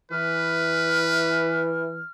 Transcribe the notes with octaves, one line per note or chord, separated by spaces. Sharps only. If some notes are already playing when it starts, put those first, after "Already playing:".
E3 B4 F6